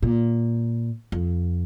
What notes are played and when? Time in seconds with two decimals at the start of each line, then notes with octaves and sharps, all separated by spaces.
0.02 A#2
1.12 F2